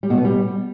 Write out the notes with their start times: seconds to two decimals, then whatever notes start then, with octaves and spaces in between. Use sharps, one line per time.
0.03 G3
0.10 B2
0.17 B3
0.25 G3